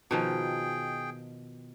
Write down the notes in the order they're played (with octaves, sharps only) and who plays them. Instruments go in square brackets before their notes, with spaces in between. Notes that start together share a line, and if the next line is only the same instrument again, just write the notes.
[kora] B2 D#3 F3 [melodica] G#4 G5